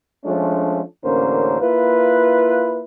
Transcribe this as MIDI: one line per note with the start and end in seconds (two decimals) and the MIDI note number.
0.24 0.81 53
0.24 0.81 56
0.24 0.81 57
0.24 0.81 61
0.24 0.81 62
1.04 1.59 33
1.04 1.59 50
1.04 1.59 58
1.04 1.59 61
1.04 1.59 70
1.04 1.59 72
1.61 2.82 58
1.61 2.82 64
1.61 2.82 65
1.61 2.82 71